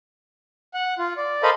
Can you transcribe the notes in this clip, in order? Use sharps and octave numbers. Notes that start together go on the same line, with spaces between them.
F#5
F4
D5
A4 A#4 C5 D#5 F5 B5